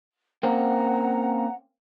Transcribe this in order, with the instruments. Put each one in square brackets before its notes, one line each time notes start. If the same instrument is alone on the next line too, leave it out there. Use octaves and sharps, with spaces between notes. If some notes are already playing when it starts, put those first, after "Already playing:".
[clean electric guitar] A#3 C4 C#4 [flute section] F#5 A#5